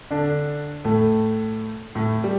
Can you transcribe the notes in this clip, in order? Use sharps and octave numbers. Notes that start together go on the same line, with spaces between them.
D3 D4
A2 A3
A2 A3
G3